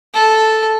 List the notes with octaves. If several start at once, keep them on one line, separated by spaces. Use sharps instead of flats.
A4